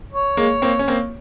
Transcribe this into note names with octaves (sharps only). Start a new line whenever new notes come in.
C#5
G#3 A#3
A#3 C4
C#4
A#3 C4